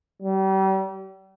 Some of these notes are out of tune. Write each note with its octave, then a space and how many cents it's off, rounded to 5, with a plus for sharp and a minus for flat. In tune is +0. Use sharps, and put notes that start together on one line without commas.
G3 -35